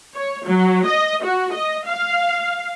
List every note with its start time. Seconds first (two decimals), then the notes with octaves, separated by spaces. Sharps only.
0.15 C#5
0.46 F#3
0.86 D#5
1.24 F#4
1.53 D#5
1.86 F5